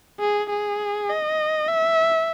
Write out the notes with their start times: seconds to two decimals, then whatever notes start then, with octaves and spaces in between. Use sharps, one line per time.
0.20 G#4
0.50 G#4
1.09 D#5
1.68 E5